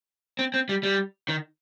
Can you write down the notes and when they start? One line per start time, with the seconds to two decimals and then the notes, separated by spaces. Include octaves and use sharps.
0.39 C4
0.54 C4
0.69 G3
0.83 G3
1.29 D#3